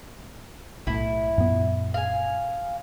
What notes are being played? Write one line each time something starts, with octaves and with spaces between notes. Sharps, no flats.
B1 A2 E4
F#2 A#2 B3
F5 G#5